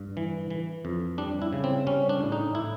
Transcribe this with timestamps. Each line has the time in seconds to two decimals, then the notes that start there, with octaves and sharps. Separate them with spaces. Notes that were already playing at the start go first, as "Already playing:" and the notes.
Already playing: G2
0.17 E3
0.50 E3
0.85 F2
1.18 G3 D4
1.42 E4
1.53 C#3
1.64 C4
1.87 G3 C#4
2.09 D4
2.21 A2
2.32 D#4
2.55 A2 E4